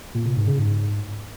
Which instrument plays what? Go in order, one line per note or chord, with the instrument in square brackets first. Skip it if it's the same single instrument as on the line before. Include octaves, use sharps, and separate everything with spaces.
[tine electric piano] A#2
C3
G#2
C#3
G#2